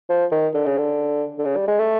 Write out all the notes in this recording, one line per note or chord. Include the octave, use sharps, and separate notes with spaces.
F3
D#3
D3
C#3
D3
D3
C#3
G3
G#3
A3